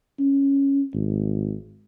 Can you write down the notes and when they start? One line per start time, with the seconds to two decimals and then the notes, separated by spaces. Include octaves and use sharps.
0.20 C#4
0.94 G#1